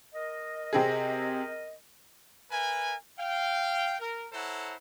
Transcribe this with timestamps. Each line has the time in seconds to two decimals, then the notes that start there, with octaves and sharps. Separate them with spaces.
0.13 A#4 D#5
0.73 C3 C4 G#4
2.51 A#4 B4 E5 G#5
3.18 F5 G5
4.00 A#4
4.32 E4 A4 C5 C#5 F#5 A#5